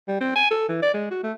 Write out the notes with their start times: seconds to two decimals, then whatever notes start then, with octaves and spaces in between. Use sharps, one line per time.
0.08 G3
0.21 C4
0.36 G#5
0.51 A4
0.69 E3
0.82 D5
0.94 G#3
1.11 F#4
1.24 A3